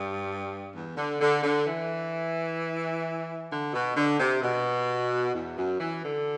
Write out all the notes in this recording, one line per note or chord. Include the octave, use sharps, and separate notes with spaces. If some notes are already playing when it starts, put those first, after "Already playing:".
Already playing: G2
E2
D3
D3
D3
E3
D3
B2
D3
C3
B2
E2
F#2
E3
D3